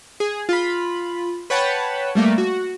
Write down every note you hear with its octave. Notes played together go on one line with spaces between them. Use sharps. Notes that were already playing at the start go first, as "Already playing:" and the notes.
G#4
F4 B5
B4 C#5 F#5 G5 A5 B5
G3 A3 A#3
F#4